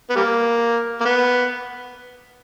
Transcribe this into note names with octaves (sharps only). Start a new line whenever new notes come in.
B3
G3 A#3
A#3
B3